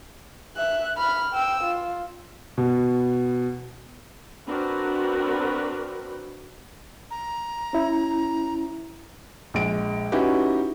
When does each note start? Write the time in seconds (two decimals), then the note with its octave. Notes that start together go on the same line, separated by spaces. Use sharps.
0.57 E5 F#6
0.97 B5 F6
1.34 G5 E6
1.64 F4
2.58 B2
4.45 C4 D4 F#4 A#4 B4
7.11 A#5
7.73 C#4 E4
9.54 A#1 G#3 D7
10.12 C#4 D#4 E4 F#4 G4 B4